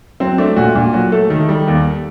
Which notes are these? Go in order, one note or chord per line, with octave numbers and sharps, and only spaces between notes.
F#3 C4
A3 D4
A#2 F#4
A#2 D4
F#3 F#4
A3 A4
D#3 A4
G3
D#2